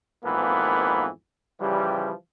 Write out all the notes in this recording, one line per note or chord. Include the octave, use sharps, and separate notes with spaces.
G#1 F2 G#2 E3 A#3 B3
C#3 E3 F3 G3